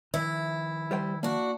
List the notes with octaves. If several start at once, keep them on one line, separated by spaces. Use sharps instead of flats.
D#3 F3 E4
G3 C5 G5
A#3 D4 F#4